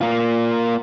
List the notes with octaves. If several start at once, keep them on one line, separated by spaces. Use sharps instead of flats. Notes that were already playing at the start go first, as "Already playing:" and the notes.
A#3 F4